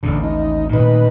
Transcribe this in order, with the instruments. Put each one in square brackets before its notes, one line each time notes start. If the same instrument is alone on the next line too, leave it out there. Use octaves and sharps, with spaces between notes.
[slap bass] A1 D#2 A2 [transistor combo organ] D3
[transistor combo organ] D#4
[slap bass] A#2 D#3 A3 [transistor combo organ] D#4 B4